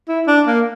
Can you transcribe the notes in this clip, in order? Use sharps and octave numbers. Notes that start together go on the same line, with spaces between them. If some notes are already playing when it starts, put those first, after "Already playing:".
E4
D4
A#3